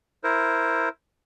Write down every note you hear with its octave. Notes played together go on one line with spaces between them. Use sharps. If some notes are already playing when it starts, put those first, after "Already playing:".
E4 A#4 C5